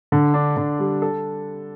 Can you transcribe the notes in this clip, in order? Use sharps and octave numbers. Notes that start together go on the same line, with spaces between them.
D3
D4
D3
G3
A4